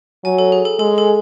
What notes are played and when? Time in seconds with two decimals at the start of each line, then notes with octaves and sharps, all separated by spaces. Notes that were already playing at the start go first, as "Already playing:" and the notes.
0.24 F#3 G#5
0.38 A4
0.52 G#4
0.65 A4
0.79 G#3 A4
0.98 A4